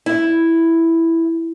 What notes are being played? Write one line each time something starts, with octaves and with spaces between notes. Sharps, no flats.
E4